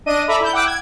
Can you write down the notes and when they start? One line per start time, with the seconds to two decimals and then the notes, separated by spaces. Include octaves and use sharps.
0.06 D4 D#5 D#7
0.28 A4 D5 E5 A#5 B5
0.40 E4 G6
0.53 F#5 G5 D6 E6 F#6
0.67 G#6